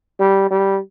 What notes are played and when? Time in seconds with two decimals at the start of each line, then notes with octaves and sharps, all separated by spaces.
0.20 G3
0.51 G3